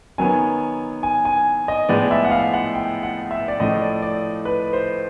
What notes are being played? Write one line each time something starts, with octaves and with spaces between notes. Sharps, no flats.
D#3 F#3 B3 G#5
G#5
G#5
D#5
A2 F3 G#3 B3 D5
E5
F#5
F5
F#5
G5
F#5
E5
D5
A2 F3 A3 D#5
D5
D5
B4
C5